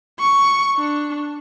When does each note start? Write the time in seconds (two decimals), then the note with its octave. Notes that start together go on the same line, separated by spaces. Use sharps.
0.20 C#6
0.77 D4